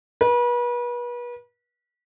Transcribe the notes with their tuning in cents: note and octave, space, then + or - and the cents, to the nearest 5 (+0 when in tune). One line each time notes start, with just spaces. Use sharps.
B4 -35